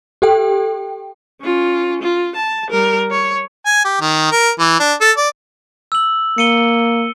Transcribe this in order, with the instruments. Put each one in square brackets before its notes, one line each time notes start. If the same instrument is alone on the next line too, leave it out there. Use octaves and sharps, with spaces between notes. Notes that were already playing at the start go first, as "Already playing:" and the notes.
[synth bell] G4 A4 G5
[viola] C#4 F4
F4
A5
G3 A#4
C#5
[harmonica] G#5
G4
D#3
A#4
E3
D4
A4
D5
[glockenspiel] E6 F#7
[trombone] A#3 [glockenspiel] C#7 D#7 G7